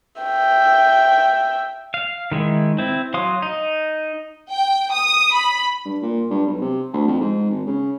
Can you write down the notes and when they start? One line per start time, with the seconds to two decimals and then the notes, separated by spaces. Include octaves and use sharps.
0.22 E5 G5
1.94 F5
2.32 D#3 G#3 E4
2.79 C4 E4
3.14 F#3 F5 C6 D#6
3.42 D#4
4.50 G5
4.93 D#6
5.33 B5
5.85 G2
6.02 A#2
6.31 G2
6.46 B1
6.61 C3
6.93 D2
7.08 F2
7.20 G#2
7.51 G#1
7.67 C#3